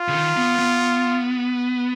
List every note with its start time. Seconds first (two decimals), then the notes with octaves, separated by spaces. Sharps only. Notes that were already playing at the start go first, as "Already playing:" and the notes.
Already playing: F4
0.08 C#3
0.13 D#3
0.37 B3
0.59 B3